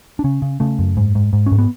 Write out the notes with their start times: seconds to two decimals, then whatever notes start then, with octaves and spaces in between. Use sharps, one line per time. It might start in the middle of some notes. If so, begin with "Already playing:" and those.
0.19 D4
0.24 C#3 C#4
0.42 C#3
0.60 C#3 A3
0.79 F#2
0.97 G#2
1.15 G#2
1.33 G#2
1.46 C#4
1.52 G#2
1.58 B3